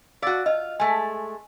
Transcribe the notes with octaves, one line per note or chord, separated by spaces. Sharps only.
F#4 D5 F5 E6
F4 D#5
G#3 A3 G#5